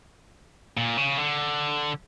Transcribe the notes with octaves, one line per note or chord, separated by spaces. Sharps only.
A#2
C#3
D3